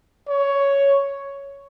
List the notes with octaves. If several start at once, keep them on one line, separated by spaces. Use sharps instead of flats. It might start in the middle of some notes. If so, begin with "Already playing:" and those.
C#5